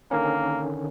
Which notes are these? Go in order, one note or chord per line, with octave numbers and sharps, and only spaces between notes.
D3 D#3 A#3 C#4